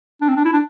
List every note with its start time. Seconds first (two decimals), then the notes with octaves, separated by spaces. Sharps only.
0.21 D4
0.28 C4
0.36 D4
0.45 E4
0.53 D4